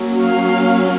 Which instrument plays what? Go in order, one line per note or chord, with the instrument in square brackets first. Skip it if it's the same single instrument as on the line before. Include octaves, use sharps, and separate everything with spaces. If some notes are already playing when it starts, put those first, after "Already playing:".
Already playing: [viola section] F#3 A#3 C#4
F5